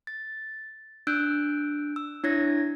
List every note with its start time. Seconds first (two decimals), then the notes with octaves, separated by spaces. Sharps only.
0.07 A6
1.07 D4 E6 F#6 G6 D7
1.96 E6
2.24 D4 E4 C#5 G#6 A#6